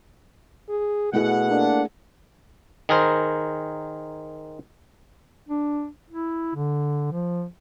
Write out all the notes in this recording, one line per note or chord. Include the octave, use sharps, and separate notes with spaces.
G#4
B2 A3 E4 G#4 F#5
A#3 D4 A4
D#3 G#4 A#4 C5
D4
E4
D3
F3